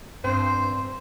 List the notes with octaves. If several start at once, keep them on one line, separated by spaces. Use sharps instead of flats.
G2 C4 C5 C6